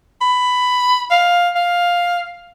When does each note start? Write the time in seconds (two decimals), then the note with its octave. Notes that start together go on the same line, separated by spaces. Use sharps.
0.21 B5
1.10 F5
1.55 F5